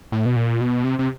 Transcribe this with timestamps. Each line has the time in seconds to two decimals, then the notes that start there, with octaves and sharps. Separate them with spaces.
0.12 A2
0.26 B2
0.36 A#2
0.61 B2
0.84 C3
0.99 C3